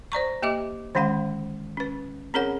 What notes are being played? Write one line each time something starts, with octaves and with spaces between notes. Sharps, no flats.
C5 D5 A#5 C#6
A#3 G4 D#5 E5 D6
D3 D#3 G#3 C#4 F5 F#5
C#4 B4
C4 C#4 G#4 A#4 C#5 F#5